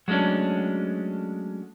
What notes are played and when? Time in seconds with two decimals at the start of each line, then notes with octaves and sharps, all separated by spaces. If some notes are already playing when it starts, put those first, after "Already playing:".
0.08 F#3 G#3 A3 C#4 D4